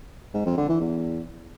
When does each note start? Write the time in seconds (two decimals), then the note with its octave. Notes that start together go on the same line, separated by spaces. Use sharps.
0.34 G#2
0.46 F2
0.57 D3
0.69 E3
0.80 E2